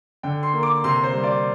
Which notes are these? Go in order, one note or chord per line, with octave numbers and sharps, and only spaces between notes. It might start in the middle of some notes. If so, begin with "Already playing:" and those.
D3 G5
C6
A#3
D6
C3 C6
C5
G3
D5